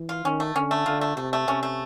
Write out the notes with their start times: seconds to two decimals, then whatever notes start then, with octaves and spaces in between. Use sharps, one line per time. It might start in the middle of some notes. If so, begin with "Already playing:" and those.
Already playing: E3
0.09 F4
0.24 D#3 C#4
0.40 A3
0.55 D3 C#4
0.71 A3
0.86 D3 F4
1.01 A3
1.16 C3 A3
1.33 A3
1.48 C3 C#4
1.63 A3